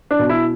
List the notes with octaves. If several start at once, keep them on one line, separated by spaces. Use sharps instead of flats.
D4
B2
E4